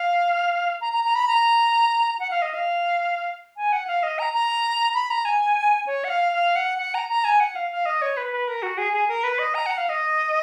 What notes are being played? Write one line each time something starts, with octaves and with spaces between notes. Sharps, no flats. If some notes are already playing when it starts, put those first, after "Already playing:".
Already playing: F5
A#5
A#5
A#5
B5
A#5
F#5
F5
D#5
F5
G#5
F#5
F5
D#5
A#5
A#5
B5
A#5
G#5
C#5
F#5
F5
F5
F#5
F#5
A#5
A#5
G#5
F#5
F5
F5
D#5
C#5
B4
B4
A#4
F#4
G#4
G#4
A#4
B4
D#5
A#5
F#5
F5
D#5